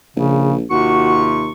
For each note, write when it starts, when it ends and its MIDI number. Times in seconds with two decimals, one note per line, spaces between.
0.17 0.65 34
0.17 0.53 49
0.71 1.52 39
0.71 1.51 48
0.71 1.51 65
0.71 1.24 66
0.71 1.51 85